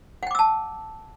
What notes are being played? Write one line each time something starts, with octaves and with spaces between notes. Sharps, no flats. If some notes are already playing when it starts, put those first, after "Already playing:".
F#5 G5 A5 D6 E6